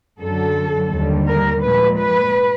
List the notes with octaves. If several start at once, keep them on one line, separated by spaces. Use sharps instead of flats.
F#2 D3 F#3 A4
D#2 D3 G3
A#4
A#2 F3 G#3 B4
B4